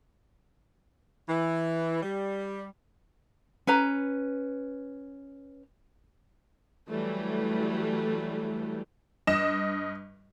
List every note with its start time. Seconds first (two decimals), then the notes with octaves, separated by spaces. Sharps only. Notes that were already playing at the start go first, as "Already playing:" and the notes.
1.28 E3
2.03 G3
3.67 C#4 B4 A#5
6.87 E3 F#3 G3 A3
9.27 G2 D#5 E7